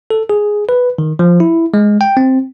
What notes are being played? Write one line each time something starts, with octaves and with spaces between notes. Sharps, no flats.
A4
G#4
B4
D#3
F3
E4
G#3
G5
C4